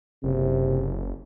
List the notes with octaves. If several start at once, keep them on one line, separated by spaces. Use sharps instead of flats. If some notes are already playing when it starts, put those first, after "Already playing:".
F#1 C3